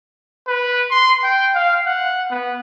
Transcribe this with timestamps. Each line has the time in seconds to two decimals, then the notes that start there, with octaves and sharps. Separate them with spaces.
0.47 B4
0.90 C6
1.24 G5
1.55 F5
1.86 F#5
2.30 B3